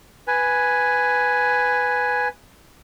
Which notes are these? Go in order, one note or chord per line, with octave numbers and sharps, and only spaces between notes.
B4 G#5